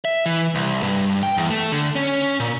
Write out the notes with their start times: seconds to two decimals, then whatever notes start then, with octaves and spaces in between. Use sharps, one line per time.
0.05 E5
0.26 E3
0.55 C2
0.83 G2
1.23 G5
1.37 E2
1.50 A3
1.72 D3
1.96 C#4
2.40 A#2